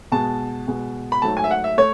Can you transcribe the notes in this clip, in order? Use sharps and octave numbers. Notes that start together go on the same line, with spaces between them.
B2 G#3 A5
B2 G#3
B5
G#2 F#3 A3 A5
G#5
E5
F#5
E5
A3 C#5